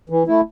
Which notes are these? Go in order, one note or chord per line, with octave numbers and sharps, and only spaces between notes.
E3
A3 E4